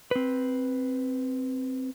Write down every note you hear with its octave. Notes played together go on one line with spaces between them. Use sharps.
C4 B4